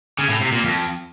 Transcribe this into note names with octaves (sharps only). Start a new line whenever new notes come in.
C#3
A2
C3
A#2
F2